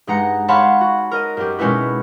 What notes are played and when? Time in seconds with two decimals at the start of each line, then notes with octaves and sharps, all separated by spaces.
0.07 G2 G#3 D#4 F#5 A#5 C#7
0.48 C#5 F5 F#5 A5 B5 C6
0.81 F#4
1.11 A#4 D#5 D#7
1.37 F#2 G4
1.59 B2 G#3 C#4 D#4 E4 B4